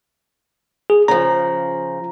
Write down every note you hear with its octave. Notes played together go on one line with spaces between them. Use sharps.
G#4
C#3 F3 A#5